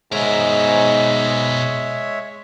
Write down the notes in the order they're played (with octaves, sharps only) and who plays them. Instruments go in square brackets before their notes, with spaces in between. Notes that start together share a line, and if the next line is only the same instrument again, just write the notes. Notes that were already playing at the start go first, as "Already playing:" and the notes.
[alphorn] G#2 [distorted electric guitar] B2 A#4 [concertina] G#3 C#5 E5